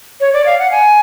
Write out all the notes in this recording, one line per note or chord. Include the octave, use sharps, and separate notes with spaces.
C#5
D5
F5
F#5
G#5